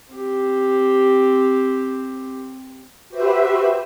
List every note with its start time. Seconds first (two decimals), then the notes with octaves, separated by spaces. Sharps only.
0.14 C4 G4
3.09 F#4 G4 B4 C5 E5